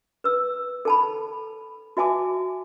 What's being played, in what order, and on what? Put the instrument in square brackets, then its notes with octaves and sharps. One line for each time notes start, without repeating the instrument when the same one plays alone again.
[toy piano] B4 E6
A4 A5 B5
F#4 E5 G#5 A5 D6